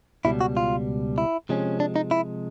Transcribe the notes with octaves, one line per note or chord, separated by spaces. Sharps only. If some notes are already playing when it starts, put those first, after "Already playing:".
C#2 B2 G3 E4
F#4
F4
E4
C3 F3 G#3 C#4
D4
D#4
E4